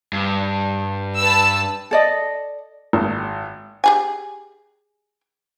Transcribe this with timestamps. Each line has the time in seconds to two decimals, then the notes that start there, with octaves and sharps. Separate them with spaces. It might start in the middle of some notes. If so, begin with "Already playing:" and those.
0.13 G2
1.19 B4 A5 E6
1.91 A4 D5 D#5
2.93 G#1
3.84 G4 G#4 G#5